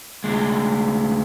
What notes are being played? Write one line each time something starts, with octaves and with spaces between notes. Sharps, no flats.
D2 G#3